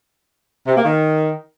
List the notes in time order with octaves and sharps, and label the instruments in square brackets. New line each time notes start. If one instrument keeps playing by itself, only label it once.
[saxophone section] C3
A#3
D#3